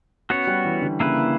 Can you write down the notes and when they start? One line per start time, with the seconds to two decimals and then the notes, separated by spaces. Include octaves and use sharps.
0.30 B3 C#4 F#4 C#5
0.47 G3
0.65 E3
0.82 D3
1.00 C#3 A#3 E4 B4